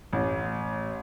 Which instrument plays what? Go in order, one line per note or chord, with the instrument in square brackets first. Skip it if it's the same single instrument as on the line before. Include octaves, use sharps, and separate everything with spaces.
[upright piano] A1